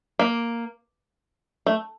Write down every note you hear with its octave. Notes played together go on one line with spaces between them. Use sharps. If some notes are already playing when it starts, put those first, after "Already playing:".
A#3
A3